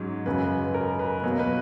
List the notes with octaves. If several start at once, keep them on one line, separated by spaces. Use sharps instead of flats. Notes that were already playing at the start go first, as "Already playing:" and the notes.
Already playing: G#2 F#3 C#4
F#2 C#3 F#3 B4
A#4
B4
B2 F#3 A#3
B4